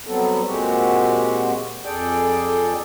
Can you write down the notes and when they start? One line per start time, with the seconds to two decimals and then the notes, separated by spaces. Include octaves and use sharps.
0.06 F#3 G3 B3 C4 A4
0.45 A#2 G#3 C4 F#4 G4
1.85 F2 G#4 A4 D5 G5